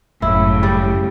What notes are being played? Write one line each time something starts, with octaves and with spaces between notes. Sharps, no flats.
G1 F#2 A2 C#3 E4
G3